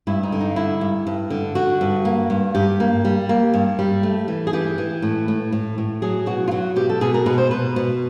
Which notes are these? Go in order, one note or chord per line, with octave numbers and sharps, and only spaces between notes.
G2 E4
D#4
D3
D#4
G2 E4
G2
G2
D3
D3 F#4
G2
A#3
G2
G2 G4
A#3
G3
A#3
G2
G3
A3
E3
G#4
E3 G4
E3
A2
A2
A2
A2
F#3 G#4
B2 F#4
F4
F#3 F#4
B2 G4
A4
B2 G#4
A#4
B2 B4
C5
B2 B4
B2